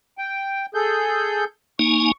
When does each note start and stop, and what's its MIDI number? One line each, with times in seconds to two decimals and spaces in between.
0.18 0.66 79
0.75 1.45 68
0.75 1.45 69
0.75 1.45 91
1.79 2.12 58
1.79 2.12 63
1.79 2.12 80
1.79 2.12 85